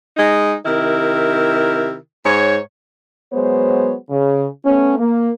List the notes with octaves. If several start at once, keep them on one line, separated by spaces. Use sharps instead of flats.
G#3 D#4
C3 D#3 E4 A#4
G#2 C#5
F#3 G#3 B3 C5 C#5
C#3
A3 B3 C#4
A#3